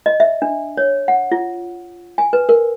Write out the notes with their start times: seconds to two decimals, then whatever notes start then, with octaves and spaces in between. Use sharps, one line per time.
0.06 D#5
0.20 E5
0.42 D4
0.77 C#5
1.08 F#5
1.32 F4
2.18 G#5
2.33 B4
2.49 A#4